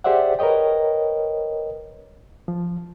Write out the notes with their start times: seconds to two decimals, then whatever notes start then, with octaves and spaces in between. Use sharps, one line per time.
0.04 G4 G#4 C5 D5 E5 F#5
0.39 A#4 B4 C#5 D#5 G5
2.48 F3